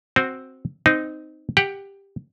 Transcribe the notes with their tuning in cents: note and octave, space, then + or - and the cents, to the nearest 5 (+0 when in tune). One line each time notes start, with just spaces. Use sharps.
C4 +0 F#4 +0
C4 -20 D#4 -5
G4 +10 F#5 +15